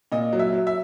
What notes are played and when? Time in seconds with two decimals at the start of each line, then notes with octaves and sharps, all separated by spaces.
0.12 A#2 D#5
0.33 F#3
0.39 E5
0.53 F#3
0.67 E5